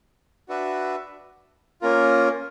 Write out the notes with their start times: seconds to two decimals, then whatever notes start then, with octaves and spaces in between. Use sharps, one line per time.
0.49 D4 F#4 B4 E5
1.82 A#3 C#4 F4 A#4